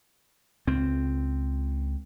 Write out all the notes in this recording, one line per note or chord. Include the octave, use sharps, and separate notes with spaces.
C#2 C4